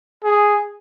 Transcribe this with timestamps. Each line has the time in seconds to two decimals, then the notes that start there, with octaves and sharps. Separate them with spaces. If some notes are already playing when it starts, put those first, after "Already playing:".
0.24 G#4